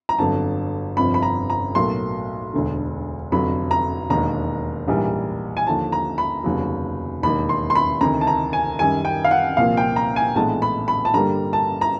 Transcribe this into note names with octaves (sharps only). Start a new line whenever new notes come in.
A#5
G1 F2 D3 F#3 A5
G1 F2 C3 F3 B5
B5
A#5
A#5
B1 A2 F#3 A#3 C6
E1 D2 D3
F1 F2 D3 F#3 B5
A#5
E1 D#2 D#3 A#5
A#1 G#2 E3 G3 A#3
G#5
D#2 D3 F3 A5
A#5
B5
F1 D#2 C#3 F#3
E1 D#2 D#3 B5
C6
C6
B5
D2 C3 D#3 A#5
A5
A#5
G#5
F#2 D#3 G3 G#5
G5
F5
F#5
C2 A#2 F3 A#3 F5
G5
A#5
G#5
A#1 A2 E3 G#3 B3 A5
B5
B5
A5
G2 D3 G3 A#3 A#5
A5
A#5